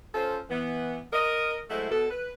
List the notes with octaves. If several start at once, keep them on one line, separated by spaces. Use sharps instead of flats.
C#4 F4 A4 C5
E3 B3
A#4 D#5
F#3 G#3 A3 E4 A4 C5
B2 A4
B4